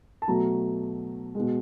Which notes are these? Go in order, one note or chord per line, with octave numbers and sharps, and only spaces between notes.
A5
B2 F#3 A3 A#5
B2 G#3